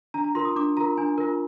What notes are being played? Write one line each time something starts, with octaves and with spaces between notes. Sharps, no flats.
D4 A#5
A#5
F4 A#4 C6
D#6
D4 D6
F4 A#4 A#5
D4 G#5
F4 A#4